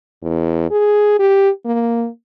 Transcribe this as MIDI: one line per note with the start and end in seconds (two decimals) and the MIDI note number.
0.23 0.69 40
0.71 1.15 68
1.19 1.50 67
1.65 2.08 58